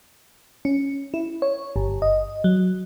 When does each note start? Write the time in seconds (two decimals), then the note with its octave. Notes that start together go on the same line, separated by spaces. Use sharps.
0.65 C#4
1.14 E4
1.42 C#5
1.76 G1
2.02 D#5
2.44 F#3